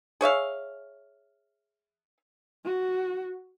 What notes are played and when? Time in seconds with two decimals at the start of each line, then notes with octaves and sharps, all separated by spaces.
0.21 G#4 C#5 E5 F5
2.65 F#4